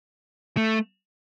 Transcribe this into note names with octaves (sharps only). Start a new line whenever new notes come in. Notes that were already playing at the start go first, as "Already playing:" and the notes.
A3